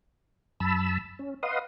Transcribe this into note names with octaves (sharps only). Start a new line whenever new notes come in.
F#2 A5 B5 E6
C#4
B4 D#5 F5 F#5 C6 D#6